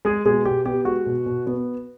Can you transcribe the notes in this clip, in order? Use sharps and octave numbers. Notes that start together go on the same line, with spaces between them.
G#3 G#4
B2 G#3 G#4
B2 G4
B3 G4
G#3 F#4
B2
B2
B3